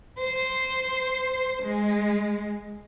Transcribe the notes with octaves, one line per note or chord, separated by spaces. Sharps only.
C5
G#3